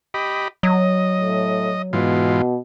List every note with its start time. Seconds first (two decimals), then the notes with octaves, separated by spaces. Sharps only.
0.14 G4 D#5 B5
0.63 F#3 D#5
1.20 A2
1.93 G#2 B2 E3 F4